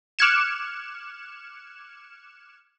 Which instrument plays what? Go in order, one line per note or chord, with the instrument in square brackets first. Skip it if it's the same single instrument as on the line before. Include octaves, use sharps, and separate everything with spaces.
[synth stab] D6 F6 F#6 G#6 C#7 E7